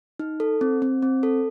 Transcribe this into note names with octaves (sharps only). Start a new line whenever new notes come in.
D#4
A4
C4
C4
C4
A4